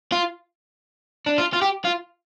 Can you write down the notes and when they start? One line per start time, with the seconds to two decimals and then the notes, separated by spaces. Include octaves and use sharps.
0.12 F4
1.27 D4
1.38 F4
1.53 F4
1.62 G4
1.85 F4